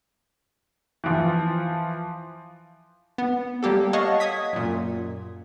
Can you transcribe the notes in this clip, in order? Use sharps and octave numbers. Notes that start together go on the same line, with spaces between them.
E3 F3
B3
G3 A#3 G4 A4
C#5 D#5 F5 F#5 A5 C#6
D#6 G#6 B6
F#2 A#2